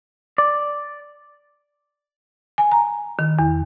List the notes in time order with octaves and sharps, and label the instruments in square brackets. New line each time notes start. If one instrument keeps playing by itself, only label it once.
[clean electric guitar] D5
[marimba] G#5
A#5
D#3
E2